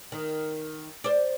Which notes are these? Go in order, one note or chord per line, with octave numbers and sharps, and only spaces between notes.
D#3
C5 D5